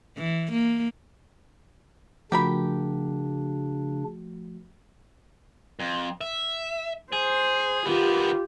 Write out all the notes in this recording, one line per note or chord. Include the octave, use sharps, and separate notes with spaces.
E3
A#3
C#3 F3 A3 D4 F#4 G4 A#4 B5
F2
E5
G#4 C5
D#3 B3 F4 G4